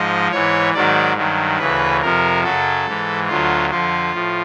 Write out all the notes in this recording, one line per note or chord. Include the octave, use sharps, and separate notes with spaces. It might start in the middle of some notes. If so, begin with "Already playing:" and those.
Already playing: G#2 F3 D#5
G#2 E3 C#5
G#2 D#3 F#3 D5
G2 D#3 F#3
D2 C#3 E3 B4
F2 C3 F3 A#4
F#2 C#3 F#3 A4
G#2 E3
D2 D3 F#3 F4
F2 D3 F3 F4
A2 F3